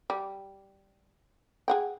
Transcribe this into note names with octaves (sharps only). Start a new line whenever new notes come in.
G3
G#4 F#5 G5